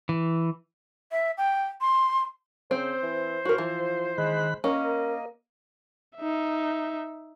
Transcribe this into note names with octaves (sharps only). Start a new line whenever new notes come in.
E3
E5
G5
C6
C#3 C4 C5
E3
A2 F#4 A#4
E3 F3
D#3 G#3 B5 F#6
A#3 C#4 A#4 D#5
D#4 E5